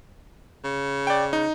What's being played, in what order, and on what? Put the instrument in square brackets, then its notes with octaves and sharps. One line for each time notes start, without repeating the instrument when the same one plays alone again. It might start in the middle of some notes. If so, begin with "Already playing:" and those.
[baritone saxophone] C#3
[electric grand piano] D5 G5
D#4